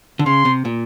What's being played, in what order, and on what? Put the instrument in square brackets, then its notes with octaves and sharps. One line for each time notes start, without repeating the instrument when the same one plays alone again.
[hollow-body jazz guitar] D3
[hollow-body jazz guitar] C#3 [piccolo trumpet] C6
[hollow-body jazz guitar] C3
A#2